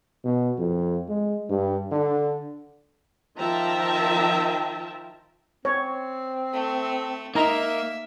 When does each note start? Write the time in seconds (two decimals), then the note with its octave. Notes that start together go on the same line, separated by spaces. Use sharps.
0.25 B2
0.58 F2
1.08 G#3
1.50 G2
1.92 D3
3.39 D#3 F3 E5 G5 A5 A#5
5.65 C4 C#5
6.53 A3
7.35 A#3 D#4 E5 A#5